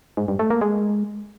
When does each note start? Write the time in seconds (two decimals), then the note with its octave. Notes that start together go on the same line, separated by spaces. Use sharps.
0.17 G#2
0.28 G2
0.39 A3
0.50 A#3
0.61 G#3